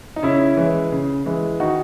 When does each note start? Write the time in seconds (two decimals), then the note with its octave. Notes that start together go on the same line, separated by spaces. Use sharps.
0.16 D#4
0.23 C#3 C#4 E4
0.57 E3 G#3
0.92 C#3
1.26 E3 G#3
1.60 D#3 D#4 F#4